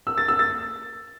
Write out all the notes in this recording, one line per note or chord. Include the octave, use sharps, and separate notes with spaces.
E6
A6
E6
A6